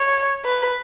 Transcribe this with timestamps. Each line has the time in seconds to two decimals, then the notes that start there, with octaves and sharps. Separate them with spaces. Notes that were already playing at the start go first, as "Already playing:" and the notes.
Already playing: C#5
0.45 B4